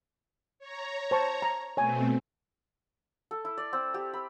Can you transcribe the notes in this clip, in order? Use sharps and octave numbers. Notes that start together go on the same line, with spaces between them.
C#5 A#5
C5 A5 C#6
A#5
B2 A3 C4 C#5 G#5
A4
E4
D5
C4
G4
B5